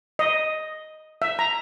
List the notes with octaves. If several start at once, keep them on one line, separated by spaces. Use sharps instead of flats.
D#5
E5
A#5